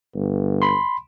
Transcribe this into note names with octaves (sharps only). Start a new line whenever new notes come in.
G1
B5 C6